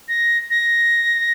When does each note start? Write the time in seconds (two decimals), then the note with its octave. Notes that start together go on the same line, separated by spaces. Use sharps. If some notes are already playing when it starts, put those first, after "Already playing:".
0.09 A#6
0.50 A#6